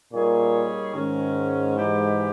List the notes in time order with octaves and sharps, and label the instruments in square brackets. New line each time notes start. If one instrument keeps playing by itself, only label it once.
[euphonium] A#2 [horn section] G3 A#3 D#4 G#4 C#5
[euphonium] G#2 [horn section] D#3 G#3 C#4
[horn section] E3 G#3 D#4 G4 B4